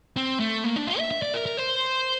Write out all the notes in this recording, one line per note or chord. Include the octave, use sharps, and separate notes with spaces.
C4
A3
A#3
D4
F4
E5
E5
D5
A#4
A#4
C5